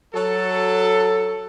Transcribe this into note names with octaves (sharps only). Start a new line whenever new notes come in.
F#3 A4